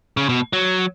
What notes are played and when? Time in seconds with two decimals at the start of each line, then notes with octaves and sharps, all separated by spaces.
0.17 C#3
0.29 B2
0.53 F#3